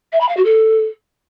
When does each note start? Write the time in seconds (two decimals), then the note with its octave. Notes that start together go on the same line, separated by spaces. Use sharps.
0.12 E5
0.21 B5
0.29 F5
0.37 F#4
0.45 A4